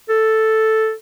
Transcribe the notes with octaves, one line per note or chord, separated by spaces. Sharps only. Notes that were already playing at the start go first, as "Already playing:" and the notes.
A4